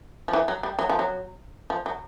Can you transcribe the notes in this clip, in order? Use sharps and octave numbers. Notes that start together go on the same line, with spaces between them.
F3
E3
F#3
G3
F#3
F3
F#3
F3
F#3